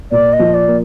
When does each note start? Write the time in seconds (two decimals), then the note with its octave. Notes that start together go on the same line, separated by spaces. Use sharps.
0.11 A#2 D5
0.32 D#5
0.39 F3
0.54 D5
0.68 A#3